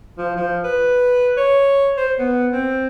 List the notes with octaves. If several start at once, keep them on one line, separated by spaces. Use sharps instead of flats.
F3
F3
B4
C#5
C5
B3
C4